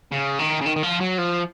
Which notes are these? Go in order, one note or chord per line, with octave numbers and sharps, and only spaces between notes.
C#3
D#3
C#3
D#3
D#3
F3
F#3
F3